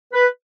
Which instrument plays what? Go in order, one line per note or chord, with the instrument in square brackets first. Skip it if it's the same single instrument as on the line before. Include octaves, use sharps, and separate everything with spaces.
[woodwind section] B4